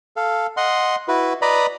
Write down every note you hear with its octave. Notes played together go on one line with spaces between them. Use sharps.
A4 F5
D#5 F#5 C6
E4 F#4 B4
B4 D5 D#5 A#5 B5